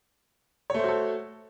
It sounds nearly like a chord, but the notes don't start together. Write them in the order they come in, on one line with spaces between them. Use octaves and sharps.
C#5 A3 C5 F#4 A4